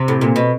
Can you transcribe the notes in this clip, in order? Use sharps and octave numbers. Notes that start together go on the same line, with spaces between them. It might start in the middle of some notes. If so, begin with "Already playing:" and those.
Already playing: C3
A2
A#2
B2